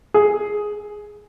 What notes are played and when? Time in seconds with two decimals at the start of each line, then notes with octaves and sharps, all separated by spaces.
0.14 G#4